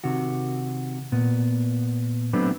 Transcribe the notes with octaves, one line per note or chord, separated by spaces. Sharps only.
C3 D#3 F#4
A#2 B3
F#3 A3 B3 C4 D4 B4